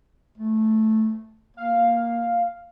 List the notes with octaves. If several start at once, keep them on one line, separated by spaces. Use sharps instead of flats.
A3
A#3 F5